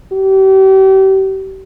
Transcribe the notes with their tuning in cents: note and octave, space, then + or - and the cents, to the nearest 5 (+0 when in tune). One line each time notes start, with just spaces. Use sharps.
G4 -35